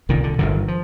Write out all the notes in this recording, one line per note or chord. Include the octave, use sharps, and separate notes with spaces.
C2 A#2 D#3
D3
G1 G2 D3 D#3
F3